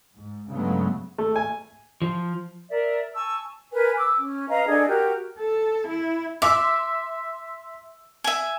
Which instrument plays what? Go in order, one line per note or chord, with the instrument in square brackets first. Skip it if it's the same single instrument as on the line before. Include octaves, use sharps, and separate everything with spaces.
[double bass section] G#2
G2 C#3 F#3 G#3 A3 B3
[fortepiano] A3
G#5
[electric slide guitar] F3
[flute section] A#4 D5 E5
G#5 A5 C#6 E6
A#4 B4 G#5
D6 E6
C#4
B4 D#5 F5 A#5
D4 G#4 A4 D#5
F#4 G4 A#4
[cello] A4
E4
[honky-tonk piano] E5 C6 E6 [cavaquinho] D6
[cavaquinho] E5 G#5